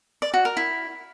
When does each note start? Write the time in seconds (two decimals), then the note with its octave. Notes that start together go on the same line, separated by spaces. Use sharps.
0.22 D5
0.34 F#4
0.45 A#4
0.57 E4